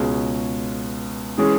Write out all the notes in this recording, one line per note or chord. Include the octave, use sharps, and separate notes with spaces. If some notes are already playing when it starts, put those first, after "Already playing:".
Already playing: C#2 B2 G#3 C#4
E3 G#3 C#4 G#4